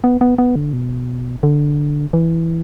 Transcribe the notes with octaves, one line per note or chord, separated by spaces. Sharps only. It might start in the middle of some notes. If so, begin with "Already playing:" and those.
B3
B3
B3
D3
B2
D3
E3